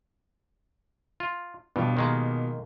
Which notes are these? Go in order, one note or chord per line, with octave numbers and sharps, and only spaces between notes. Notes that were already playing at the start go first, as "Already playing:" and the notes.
F4
G2 B2 F3 G4
D#3 G#3 A#3